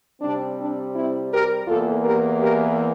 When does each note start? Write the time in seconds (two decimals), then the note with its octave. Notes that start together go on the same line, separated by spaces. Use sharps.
0.21 C3 G3 C4 D4
0.58 D4
0.94 C4 E4
1.31 G4 A#4
1.67 E2 E3 A#3 F4 A4
2.03 G4 A#4
2.40 G4 A#4